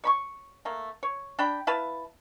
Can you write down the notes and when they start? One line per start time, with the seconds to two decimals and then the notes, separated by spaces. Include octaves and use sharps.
0.04 C#5 B5 C#6
0.65 A3 A#3
1.03 C#5
1.39 D4 G5 B5
1.67 E4 B4 F5 A5